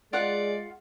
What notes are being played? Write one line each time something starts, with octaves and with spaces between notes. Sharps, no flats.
G#3 F4 D5 F#5